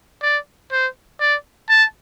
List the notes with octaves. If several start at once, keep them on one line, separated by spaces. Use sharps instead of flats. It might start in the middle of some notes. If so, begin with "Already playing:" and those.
D5
C5
D5
A5